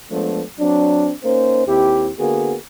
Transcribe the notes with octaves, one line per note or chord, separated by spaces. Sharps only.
F3 G#3 A3 B3 D4
F#3 C4 D4
A#3 C#4 D#4 C5
D#2 C4 E4 G4
D3 A#3 B3 F#4 G#4